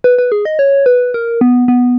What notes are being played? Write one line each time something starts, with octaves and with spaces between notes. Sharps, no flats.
B4
B4
G#4
D#5
C#5
B4
A#4
B3
B3